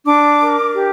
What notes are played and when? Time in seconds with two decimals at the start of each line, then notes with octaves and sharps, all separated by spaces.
0.05 D4 D6
0.40 A#4
0.75 G4